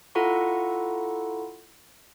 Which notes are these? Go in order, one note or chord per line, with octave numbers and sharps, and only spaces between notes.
E4 F4 A4 F#5 A#5 C#6